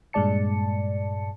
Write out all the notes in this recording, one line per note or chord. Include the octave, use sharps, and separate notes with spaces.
G2 A#2 G#3 D5 A5 C#7